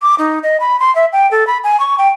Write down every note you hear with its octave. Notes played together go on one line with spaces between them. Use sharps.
D6
D#4
D#5
B5
C6
E5
G5
A4
B5
G#5
C#6
G5